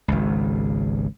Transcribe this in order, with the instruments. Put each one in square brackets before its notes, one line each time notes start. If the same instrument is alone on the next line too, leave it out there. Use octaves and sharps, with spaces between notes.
[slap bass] G#1 C#2